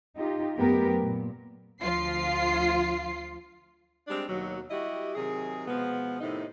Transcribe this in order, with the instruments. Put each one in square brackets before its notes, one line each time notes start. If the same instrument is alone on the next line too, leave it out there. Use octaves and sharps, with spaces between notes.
[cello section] D#4 F4 G4
F#2 A3 B3 G4 A#4
A#2
[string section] D2 F3 F4 C7
[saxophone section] G3 G#3 C4 D4
D#2 B2 F#3
G3 E4 F#4 G4 D#5
C3 D#3 F#3 G#4
B2 F3 G#3 B3
A2 C3 D#3 D#4